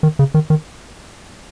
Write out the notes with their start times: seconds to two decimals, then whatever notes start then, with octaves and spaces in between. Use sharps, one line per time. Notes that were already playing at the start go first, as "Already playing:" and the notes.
0.03 D#3
0.19 C#3
0.34 D#3
0.50 D#3